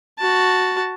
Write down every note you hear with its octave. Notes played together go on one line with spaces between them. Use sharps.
F#4 A5